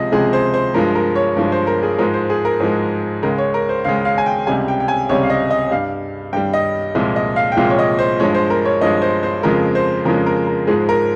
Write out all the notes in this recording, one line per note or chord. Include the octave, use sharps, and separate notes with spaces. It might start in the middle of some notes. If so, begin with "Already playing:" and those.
Already playing: C#2 C3 F3 G#3 D#5
C#2 C3 F3 G#3 G#4
C5
C5
G2 F3 G#3 A#4
A#4
C#5
G2 F3 G#3
C5
A#4
G#4
G#2 F3 G#3 A#4
C5
G#4
A#4
G#2 F3 G#3
C#2 C#3 G#3 A#4
C#5
A#4
C5
C#2 C#3 G#3 F5
F5
G#5
G5
C#2 C3 G3 G#5
G5
G5
G#5
C#2 C3 G3 C#5
F5
D#5
D#5
G2 G3 F5
G2 G3 G5
D#5
C2 A#2 F3 G#3
D#5
F5
G5
C2 A#2 F3 G#3 F5
C#5
D#5
C5
G2 F3 G#3 C#5
C5
A#4
C#5
G2 F3 G#3 D#5
C5
C5
F2 C#3 F3 G#3 A#4
C5
F2 C#3 F3 G#3 A#4
A#4
A#4
G#2 F3 G#3 G#4
A#4